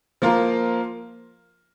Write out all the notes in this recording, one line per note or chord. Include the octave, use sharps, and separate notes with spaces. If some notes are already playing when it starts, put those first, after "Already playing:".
F3 A#3 F4 A#4